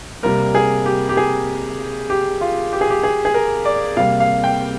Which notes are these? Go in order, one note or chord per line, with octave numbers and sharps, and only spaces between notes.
C3 G3 A#3 A#4
G#4
G4
G4
G#4
G4
F4
G4
G#4
G4
G#4
G#4
A#4
D5
C3 G3 A#3 F5
F5
G5